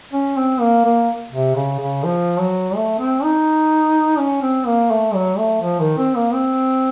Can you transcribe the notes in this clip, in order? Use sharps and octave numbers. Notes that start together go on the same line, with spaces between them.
C#4
C4
A#3
A#3
C3
C#3
C#3
F3
F#3
A3
C4
D#4
C#4
C4
A#3
A3
F#3
A3
F3
D#3
C4
A#3
C4